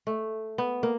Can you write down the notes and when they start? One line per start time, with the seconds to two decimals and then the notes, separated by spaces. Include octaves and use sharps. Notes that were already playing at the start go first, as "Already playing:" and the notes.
0.07 A3
0.58 B3
0.83 A#3